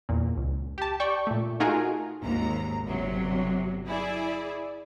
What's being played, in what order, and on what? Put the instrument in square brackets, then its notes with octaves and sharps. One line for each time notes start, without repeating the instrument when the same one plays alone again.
[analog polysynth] E2 A#2
C#2
G4 A5
D5 G5 C#6
A#2 A3
A3 D#4 F4 F#4 G#4 A#4
[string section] G#1 D#2 G#2 A#5
G1 C3 F#3
E4 G#4 D5